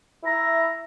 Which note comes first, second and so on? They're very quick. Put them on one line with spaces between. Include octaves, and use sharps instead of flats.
E4 A#5 E5